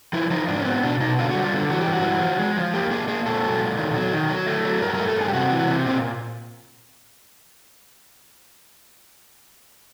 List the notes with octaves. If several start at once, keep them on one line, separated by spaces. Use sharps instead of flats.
F3 E4
F3 D#4
G#2 D4
C#4
B3 C4
B2 D4
B2 D#4
D3 F4
G3 F#4
F4
D3
E3 F#4
G4
G2
F#4
E3
F3
G#3
F3
A#3 G4
A#3 G#4
A#3 G#4
A#2 A4
F#3
A#2
D#3
F#3
D#3
F#3
A3
F#3
G2 A#4
A4
A#4
A3
A4
G2 G#4
G4
C3 F#4
E3
C3
A#2 C4